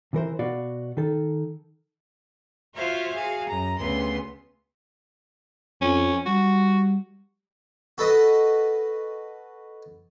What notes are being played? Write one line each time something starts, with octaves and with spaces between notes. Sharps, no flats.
C3 E3 A#4 C5
B2 F#4 D5 F5
D#3 A4
F4 F#4 C5 C#5 E5 F5
F#4 G#4 F5
F#2 A#5
D2 C#3 B3 C6
F2 C#4
G3 F#4
F#4 A4 B4 D#5